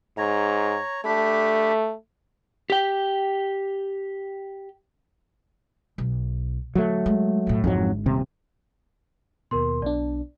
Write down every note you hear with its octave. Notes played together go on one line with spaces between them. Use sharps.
G#2 C#5 A#5
A3 D4 G4 B5
G4 G5
B1
D3 F#3 A3
G#3
F2 A2
G#1 F2 G#2 D3 F#3
D#1 C3
D#2 B2 A#4 C6
B1 B2 D4 D5